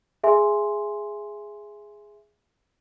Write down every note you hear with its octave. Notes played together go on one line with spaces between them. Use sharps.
G#4 E5 G#5 C6